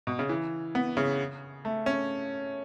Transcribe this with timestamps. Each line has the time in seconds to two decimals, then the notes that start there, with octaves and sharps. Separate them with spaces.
0.07 B2
0.19 C#3
0.29 E3
0.75 B3
0.97 C#3
1.65 A3
1.86 C#4